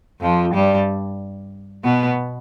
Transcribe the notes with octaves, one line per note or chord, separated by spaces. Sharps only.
F2 F3
G2 G3
B2 B3